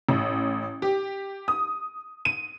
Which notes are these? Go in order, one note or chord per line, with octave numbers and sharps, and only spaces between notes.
A1
G4
D#6
D#7